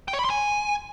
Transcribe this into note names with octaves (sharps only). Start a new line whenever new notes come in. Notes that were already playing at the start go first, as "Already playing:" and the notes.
G5
C#5
B5
C6
G#5